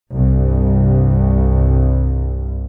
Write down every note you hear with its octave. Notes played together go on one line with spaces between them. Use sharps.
C2 G2